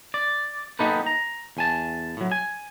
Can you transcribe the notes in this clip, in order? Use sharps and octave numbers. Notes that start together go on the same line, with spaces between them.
D5
A#3 B3 D#4 G4 A4 B4
A#5
E2 G#5 A5
A2 F#3
G#5